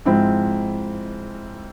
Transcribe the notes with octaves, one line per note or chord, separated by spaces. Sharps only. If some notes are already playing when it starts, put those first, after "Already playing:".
G#2 F3 G#3 C4 E4